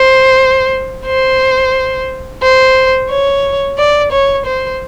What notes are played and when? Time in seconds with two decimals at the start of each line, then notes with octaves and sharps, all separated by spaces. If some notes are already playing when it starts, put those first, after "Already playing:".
Already playing: C5
1.07 C5
2.43 C5
3.10 C#5
3.78 D5
4.12 C#5
4.46 C5